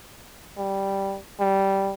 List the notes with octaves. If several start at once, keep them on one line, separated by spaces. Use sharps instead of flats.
G3
G3